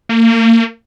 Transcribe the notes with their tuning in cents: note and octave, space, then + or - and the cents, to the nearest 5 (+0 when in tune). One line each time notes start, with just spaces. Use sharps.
A#3 -35